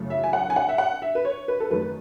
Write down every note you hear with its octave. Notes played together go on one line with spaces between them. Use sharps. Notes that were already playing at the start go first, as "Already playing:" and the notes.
Already playing: F#2 C#3 E3 A3
E5
G#5
F#5
G#5
F#5
E5
F#5
E5
B4
C#5
B4
A4
F#2 D#3 A3 B4